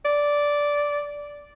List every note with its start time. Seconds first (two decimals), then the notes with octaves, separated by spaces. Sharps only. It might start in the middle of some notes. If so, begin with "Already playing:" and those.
0.05 D5